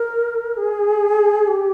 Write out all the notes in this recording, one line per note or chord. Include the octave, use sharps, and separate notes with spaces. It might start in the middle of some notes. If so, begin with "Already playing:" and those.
Already playing: A#4
G#4
G4